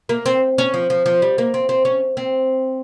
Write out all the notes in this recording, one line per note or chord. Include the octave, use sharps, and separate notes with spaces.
A#3
C4
C#4
F3
F3
F3
G3
A#3
C4
C4
C#4
C4